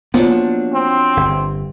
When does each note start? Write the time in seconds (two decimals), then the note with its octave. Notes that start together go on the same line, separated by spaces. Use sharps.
0.14 F3 F#3 A#3 B3 D4
0.73 C4
1.17 G1